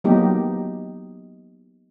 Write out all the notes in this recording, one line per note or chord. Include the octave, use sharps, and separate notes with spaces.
F#3 A#3 B3 D#4 G4